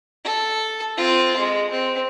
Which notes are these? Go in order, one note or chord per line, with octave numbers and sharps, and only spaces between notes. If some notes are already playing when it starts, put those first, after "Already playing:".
A4
C4 F4
G#3
C4